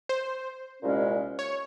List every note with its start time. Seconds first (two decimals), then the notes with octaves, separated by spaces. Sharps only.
0.09 C5
0.82 C2 A#2 G#3 C#4
1.39 C#5